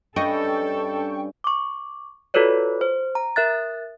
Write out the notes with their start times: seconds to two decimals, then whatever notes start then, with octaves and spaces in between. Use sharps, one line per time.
0.16 G2 C#4 D4 A4 B4 D#5 G5 C#6
1.44 C#6 D6
2.34 F4 F#4 A4 B4 C#5 D5
2.81 C5
3.15 A#5
3.36 A#4 E5 F#6 A6